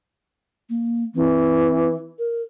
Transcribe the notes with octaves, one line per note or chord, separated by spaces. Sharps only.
A#3
E3 C4
A#4